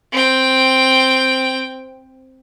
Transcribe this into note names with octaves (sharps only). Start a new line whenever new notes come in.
C4 G5